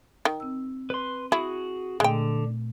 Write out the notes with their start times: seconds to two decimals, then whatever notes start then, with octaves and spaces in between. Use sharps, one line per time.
0.25 D#3
0.40 C4 E6
0.90 B4 C6
1.32 E4 F#4 G#4
2.00 A#2 D3 G#3 A3 G5